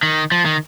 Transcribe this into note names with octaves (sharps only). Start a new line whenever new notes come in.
D#3
F3
D#3